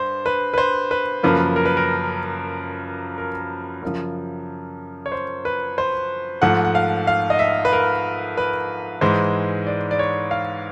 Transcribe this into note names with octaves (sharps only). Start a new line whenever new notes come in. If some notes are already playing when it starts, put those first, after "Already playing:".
Already playing: G2 C5
B4
B4
C5
B4
F#2 C#3 F3 A#3 B4
A#4
B4
A#4
A#4
F#2 C#3 F3
C#5
C5
B4
C5
G#2 F3 A3 F#5
F#5
F5
F5
D#5
E5
B4
A#4
B4
G#2 E3 G#3 C5
D5
D5
C#5
F5